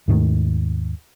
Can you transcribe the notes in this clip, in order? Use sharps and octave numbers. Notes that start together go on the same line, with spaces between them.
D#2 G#2 D#3 A3